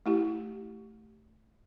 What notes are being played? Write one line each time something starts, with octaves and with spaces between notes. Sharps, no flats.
A3 E4 G4